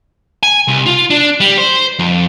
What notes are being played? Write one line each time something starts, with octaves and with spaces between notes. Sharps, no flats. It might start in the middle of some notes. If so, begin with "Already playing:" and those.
G#5
C2
F4
D4
G3
C5
F2